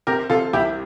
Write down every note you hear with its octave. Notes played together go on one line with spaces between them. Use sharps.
C3 G4 A#4
C3 F4 A4
C2 E4 G4